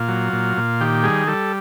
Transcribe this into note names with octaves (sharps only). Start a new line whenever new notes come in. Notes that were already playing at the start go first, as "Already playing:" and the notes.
Already playing: A#2 F4
F#3
A#2
A#2
D#3 G4
G3 G#4
G3 A4